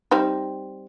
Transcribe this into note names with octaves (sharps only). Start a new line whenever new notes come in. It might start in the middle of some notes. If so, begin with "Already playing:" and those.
G3 C4 D#4